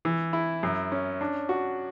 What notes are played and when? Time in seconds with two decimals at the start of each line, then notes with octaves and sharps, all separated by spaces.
0.05 E3
0.33 E4
0.63 F#2
0.92 C#4
1.21 D4
1.49 F#4